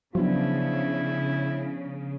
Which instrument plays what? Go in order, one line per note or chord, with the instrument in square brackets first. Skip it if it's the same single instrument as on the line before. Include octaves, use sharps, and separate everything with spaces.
[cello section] C#3 [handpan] F3 B3 D4 [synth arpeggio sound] F#3 [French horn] E4